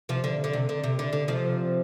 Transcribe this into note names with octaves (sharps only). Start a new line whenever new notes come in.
C3 F3
D3
D3
C3
D3
C3
D3
D3
C3 F3